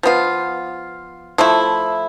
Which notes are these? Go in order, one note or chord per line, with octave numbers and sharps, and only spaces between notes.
F3 B3 F4
F3 A3 E4